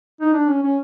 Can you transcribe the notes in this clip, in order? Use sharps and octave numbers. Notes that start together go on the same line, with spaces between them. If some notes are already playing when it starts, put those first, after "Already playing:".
D#4
D4
C#4
C#4